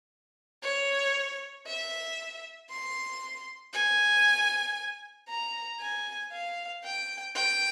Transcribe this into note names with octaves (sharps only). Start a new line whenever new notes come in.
C#5
E5
C6
G#5
A#5
G#5
F5
G5
G5